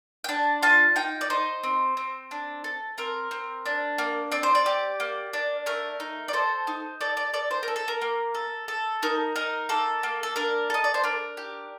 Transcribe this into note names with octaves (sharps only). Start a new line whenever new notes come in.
G5
D4 A5
F4 A5
D#4 G5
D5
D#4 C5
C4
C4
D4
A4
C4 A#4
C4
D4
A#3
C4 D5
C5
D5
G4
A#3
D4
A3 A#4
D#4
D5
A4 C5
D#4
A4 D5
D5
A4 D5
C5
A4 A#4
A4
A#4
A#3
A4
A4
D#4 A#4
D#4 A#4
A#3 A4
A#3
A4
D4 A#4
A4 D#5
D5
C5
D4 A#4
G4